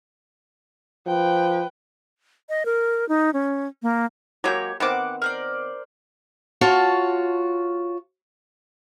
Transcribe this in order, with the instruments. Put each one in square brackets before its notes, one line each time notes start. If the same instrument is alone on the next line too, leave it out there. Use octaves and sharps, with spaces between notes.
[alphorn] F3 [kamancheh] B4 G5
[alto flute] D#5
A#4
D#4
C#4
A#3
[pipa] F#3 G#3 A#3 [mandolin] G4 C#5 G6
[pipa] D#3 B3 C4 [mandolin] F#5 D6
[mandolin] A#4 C5 D5
[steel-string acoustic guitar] F4 F#4 C#5 A5